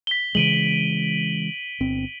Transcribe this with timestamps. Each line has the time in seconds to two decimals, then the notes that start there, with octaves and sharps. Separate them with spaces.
0.07 B6 G7
0.35 C#3 E3 G#3 D7 D#7 F#7
1.80 G1 C4